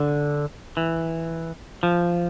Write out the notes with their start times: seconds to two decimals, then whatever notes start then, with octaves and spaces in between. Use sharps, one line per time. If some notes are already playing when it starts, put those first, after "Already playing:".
Already playing: D3
0.77 E3
1.83 F3